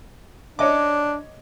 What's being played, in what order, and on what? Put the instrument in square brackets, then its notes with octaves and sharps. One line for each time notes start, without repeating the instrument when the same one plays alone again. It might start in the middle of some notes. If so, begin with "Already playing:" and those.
[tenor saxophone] D4 [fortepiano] C#5 D#5 D6